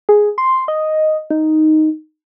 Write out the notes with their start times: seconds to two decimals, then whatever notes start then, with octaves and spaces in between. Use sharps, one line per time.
0.09 G#4
0.38 C6
0.68 D#5
1.30 D#4